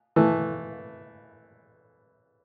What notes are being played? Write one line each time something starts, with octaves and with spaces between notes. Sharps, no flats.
E3 A3